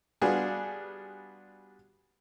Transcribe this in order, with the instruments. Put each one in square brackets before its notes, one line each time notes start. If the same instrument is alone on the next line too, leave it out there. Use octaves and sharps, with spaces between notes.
[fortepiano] G3 B3 D4 F4 F#4 G#4